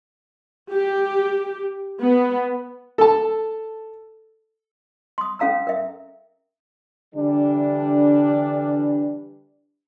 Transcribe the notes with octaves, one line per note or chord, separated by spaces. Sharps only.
G4
B3
A4 A5
C6 D#6
C#4 A4 F5 A#5 E6
A#4 E5
D3 E3 G3 D4